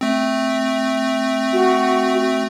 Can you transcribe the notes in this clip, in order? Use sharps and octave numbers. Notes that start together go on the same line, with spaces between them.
A3 C4
F#4